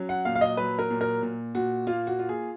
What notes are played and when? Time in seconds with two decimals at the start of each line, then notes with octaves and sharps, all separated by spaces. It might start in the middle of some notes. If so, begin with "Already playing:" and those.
Already playing: F#3 C#4
0.09 F#5
0.25 A#2 F5
0.35 F5
0.41 D#5
0.57 F#3 B4
0.79 A#4
0.91 A#2
1.01 A#4
1.23 A#2
1.55 A#2 F#4
1.87 A#3 F4
2.07 F#4
2.19 F4
2.29 G#4